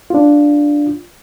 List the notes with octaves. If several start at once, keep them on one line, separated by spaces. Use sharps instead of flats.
D4 F4